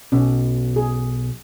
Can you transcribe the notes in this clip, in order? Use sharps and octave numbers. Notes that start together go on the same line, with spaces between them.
B1 C#4
G#4